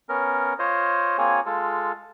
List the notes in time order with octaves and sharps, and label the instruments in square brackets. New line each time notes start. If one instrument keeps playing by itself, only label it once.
[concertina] B3 C#4 A#4
F4 C5 C#5 D#5
A#3 C4 F4 G#4 C#5 G#5
G#3 F4 A4